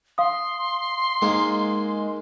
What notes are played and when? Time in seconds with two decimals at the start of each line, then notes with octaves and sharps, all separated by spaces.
0.18 F5 C6 D#6
1.22 G#2 G#3 A#3